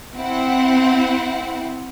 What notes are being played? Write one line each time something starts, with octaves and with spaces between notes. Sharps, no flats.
C4 E4 F#5